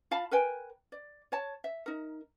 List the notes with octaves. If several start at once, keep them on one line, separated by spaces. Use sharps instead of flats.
F4 F5 A5 B5
A#4 B4 G5 G#5
D5
C#5 A5
E5
D#4 A#4